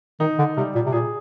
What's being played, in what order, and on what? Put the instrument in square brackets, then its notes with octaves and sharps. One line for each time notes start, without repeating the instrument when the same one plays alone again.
[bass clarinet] D#3 [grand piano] D#4
[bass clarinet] D3
[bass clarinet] C3 [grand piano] G3
[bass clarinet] A#2
C3
[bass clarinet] A#2 [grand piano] G#4